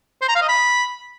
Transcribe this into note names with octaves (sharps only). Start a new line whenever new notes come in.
C5
A#5
F5
D#5
B5